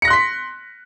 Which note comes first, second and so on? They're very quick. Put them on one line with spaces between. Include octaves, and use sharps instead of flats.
C#7 A#6 F#6 C6 B6